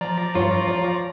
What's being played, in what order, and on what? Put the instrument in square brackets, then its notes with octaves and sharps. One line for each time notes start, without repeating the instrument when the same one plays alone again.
[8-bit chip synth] F3 D5 A#5
[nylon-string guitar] G2 C#5 [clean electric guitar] F4
[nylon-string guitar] C#5